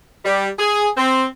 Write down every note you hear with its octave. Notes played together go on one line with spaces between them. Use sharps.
G3
G#4
C4